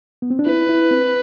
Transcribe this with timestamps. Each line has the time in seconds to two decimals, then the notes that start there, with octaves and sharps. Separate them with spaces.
0.22 B3
0.30 C4
0.39 D4
0.46 E4 B4
0.69 E4
0.91 C4